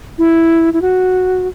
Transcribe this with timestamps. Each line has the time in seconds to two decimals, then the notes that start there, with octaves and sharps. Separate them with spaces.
0.18 E4
0.73 E4
0.82 F#4